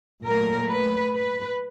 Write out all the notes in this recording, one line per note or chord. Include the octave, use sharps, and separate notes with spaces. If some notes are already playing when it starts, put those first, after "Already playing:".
A#2 F#3 A3 A#4
B4
B4